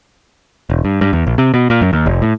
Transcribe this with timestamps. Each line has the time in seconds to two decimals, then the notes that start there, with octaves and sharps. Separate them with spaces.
0.70 E1
0.85 G2
1.01 G2
1.13 E2
1.27 A#1
1.38 C3
1.54 B2
1.70 A#2
1.81 F#2
1.93 D#2
2.06 F1
2.22 A2